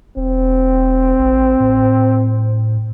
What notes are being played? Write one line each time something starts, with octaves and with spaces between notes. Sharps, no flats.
E1 C4
A1
A2